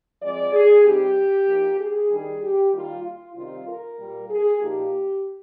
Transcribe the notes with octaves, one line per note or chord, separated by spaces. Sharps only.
F3 G#3 C4 D5
G#4
C3 G3 C4 D#4 G4
F3 A#3 D#4
G#4
D#3 G3 D4 G#4
G4
D#3 G3 A#3 F4
F4
C3 D#3 G3 C4 F4
A#4
A#2 G3 A#3
G#4
A#2 F3 A#3 D#4 G4